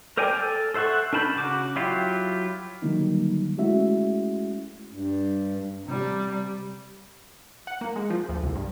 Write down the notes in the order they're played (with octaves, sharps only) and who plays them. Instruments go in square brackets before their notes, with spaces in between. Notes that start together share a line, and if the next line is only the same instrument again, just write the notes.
[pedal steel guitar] A#4 C5 D5 G5 G#5
A4
A4 C5 E5 F#5 C#6
D4 A#4 A5 B5 G6
C#3 F#4 D6
F#3 E4 F4 G4
[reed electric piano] D3 D#3 F#3 G3 A#3 D#4
G#3 A3 C#4 E4 F#4 E5
[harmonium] G2
[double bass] C3 G3
[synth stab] F#5
A#3
G#3
F3
D2
C2
G2